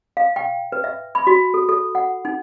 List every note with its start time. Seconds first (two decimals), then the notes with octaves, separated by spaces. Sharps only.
0.17 F5
0.36 G5
0.72 B4
0.84 E5
1.15 B5
1.27 F#4
1.54 A4
1.69 A4
1.95 F#5
2.25 D#4